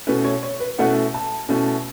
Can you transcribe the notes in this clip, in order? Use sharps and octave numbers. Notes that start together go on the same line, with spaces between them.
B2 A3 C#4 E4 B4
C#5
C#5
B4
B2 A3 C#4 E4 F#5
A5
B2 A3 C#4 E4